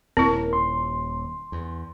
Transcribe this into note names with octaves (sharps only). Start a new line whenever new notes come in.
D#1 C4 E4 A#4
C6
E2